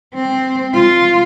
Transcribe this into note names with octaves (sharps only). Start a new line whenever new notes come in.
C4
F4